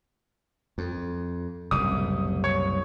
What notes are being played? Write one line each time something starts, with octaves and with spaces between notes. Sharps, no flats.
F2
F#1 C2 A2 D#6
C#5